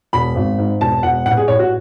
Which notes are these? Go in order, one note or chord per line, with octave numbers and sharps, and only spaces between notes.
E1 B5
G#1
G#2
E1 A5
E1 F#5
A1 F#5
G#4
A1 C#5
F#4